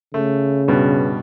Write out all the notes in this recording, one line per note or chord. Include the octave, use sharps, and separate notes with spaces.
C#3 A3
G2 B2